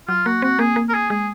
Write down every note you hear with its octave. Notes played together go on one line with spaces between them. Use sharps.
F#3 F4
A#3 F#4
C4 F#4
A#3 G#4
A#3
A#4
G#4
G#3 G#4